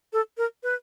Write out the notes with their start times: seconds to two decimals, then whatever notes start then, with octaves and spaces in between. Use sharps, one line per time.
0.13 A4
0.38 A#4
0.63 B4